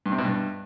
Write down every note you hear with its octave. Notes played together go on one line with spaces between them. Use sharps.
G2
C3
B2
G2